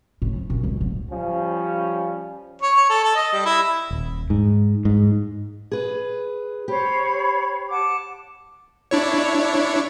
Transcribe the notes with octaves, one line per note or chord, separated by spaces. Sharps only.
A2
F3
A#2
C#2
D1
F3 G3 C#4
C#5
C#5
A4
A4
D#5
G3
E4
D#1
G#2
G#2
G#4 B4
G4 C5 C#5 B5
F#5 A5 D6
D4 E4 C#5